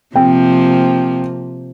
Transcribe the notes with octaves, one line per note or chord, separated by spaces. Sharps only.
C3 F3 A#3 C4 G5